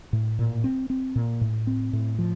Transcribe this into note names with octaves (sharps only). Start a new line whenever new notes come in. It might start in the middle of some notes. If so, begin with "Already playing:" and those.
A2
A#2
C4
C4
A#2
A2
C4
A2
F3